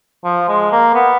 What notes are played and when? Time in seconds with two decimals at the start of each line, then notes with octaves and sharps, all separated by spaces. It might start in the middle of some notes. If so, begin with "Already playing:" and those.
0.24 F3
0.49 G#3
0.72 A#3
0.95 B3